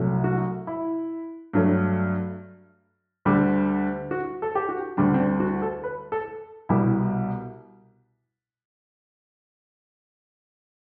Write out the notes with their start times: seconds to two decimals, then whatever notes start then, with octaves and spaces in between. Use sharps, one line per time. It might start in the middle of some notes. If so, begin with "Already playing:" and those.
Already playing: C2 C3 F#3 A3
0.24 F#4
0.67 E4
1.53 G2 F#3 A3
3.25 D2 D3 G3
4.11 F#4
4.42 A4
4.55 G4
4.69 F#4
4.97 D2 D3 G3 D4
5.14 C4
5.19 D4
5.40 F#4
5.62 A4
5.84 B4
6.12 A4
6.69 C2 B2 G3 E4